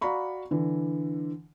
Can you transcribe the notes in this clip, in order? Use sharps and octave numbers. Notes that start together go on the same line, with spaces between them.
F#4 D5 F5 A#5 B5 C#6
D3 E3